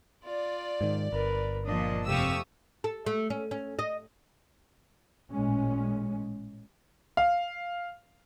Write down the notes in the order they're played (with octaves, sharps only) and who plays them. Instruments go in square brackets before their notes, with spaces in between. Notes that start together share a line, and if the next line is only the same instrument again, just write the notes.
[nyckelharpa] F4 [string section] D5
[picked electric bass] G#2 D#3
[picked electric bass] G1 [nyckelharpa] A#4 B4
[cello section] A#2 F3 D4 [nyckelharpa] D#5
[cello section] F2 C3 A3 [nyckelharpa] G4 F5 [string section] C#6 D#6 E6
[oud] A4
A3
C#4
C#4
D#5
[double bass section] A1 A#2 G#3 C#4
[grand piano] F5